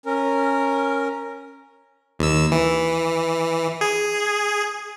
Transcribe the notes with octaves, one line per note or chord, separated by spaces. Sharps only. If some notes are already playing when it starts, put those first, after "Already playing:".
C#4 A#4
D#2 E6
E3
G#4